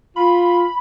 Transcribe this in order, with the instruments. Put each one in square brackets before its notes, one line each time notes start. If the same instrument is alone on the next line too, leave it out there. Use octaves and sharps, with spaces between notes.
[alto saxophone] F4 [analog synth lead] B5